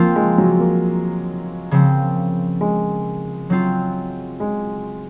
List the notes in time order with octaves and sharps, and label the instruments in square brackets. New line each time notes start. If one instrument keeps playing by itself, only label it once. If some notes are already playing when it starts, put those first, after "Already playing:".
Already playing: [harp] F3 C4 F4 [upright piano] A#3
[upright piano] G#3
F#3
A#3
[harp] C#3 F3 C4
[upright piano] G#3
[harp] F#3 C4 F4
[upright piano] G#3